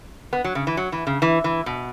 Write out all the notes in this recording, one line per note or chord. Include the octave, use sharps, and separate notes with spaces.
B3
F#3
C#3
E3
F#3
E3
C#3
E3
E3
B2